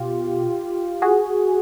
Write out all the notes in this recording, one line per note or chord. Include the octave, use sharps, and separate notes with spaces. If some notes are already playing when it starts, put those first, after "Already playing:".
Already playing: B2 F4 G4
F#4 G#4